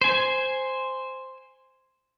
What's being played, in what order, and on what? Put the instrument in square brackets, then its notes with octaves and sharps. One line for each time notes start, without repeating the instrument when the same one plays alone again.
[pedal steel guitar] C5 G#5